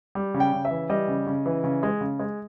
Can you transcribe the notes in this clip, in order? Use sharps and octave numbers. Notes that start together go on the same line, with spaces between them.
G3
C#3
G5
C#3
E5
E3
G3 D#5
C#3
C#3
E3
C#3
G#3
C#3
G#3